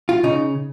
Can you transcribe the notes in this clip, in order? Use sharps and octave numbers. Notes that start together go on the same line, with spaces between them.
F4
C#3 D#4